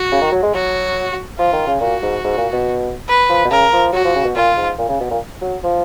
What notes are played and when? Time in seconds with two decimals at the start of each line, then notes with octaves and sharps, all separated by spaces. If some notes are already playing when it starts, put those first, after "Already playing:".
Already playing: F#4
0.12 C#3
0.21 D#3
0.32 F#3
0.43 G#3
0.54 F#3 F#4
1.39 F3 F4
1.53 D#3
1.67 C#3
1.81 A#2 F#4
2.03 G#2
2.24 G#2
2.37 A#2
2.53 B2
3.08 B4
3.29 F3
3.45 B2
3.51 C#3 A#4
3.73 F3
3.93 F#3 F#4
4.04 F3
4.15 C#3
4.25 B2
4.36 A#2 F4
4.56 G#2
4.78 A#2
4.89 C#3
5.00 B2
5.11 A#2
5.41 F#3
5.63 F3